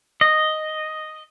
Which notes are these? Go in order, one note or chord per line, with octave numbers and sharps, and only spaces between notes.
D#5